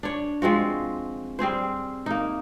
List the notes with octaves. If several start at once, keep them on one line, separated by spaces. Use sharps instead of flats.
D4 C#5
F3 G#3 C4 F#4
G3 C4 G#4 C5
A#3 D#4